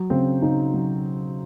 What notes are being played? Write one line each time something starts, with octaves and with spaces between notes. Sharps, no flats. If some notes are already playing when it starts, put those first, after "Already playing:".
Already playing: F#3
C#3 C4
C#3 D#4
F#3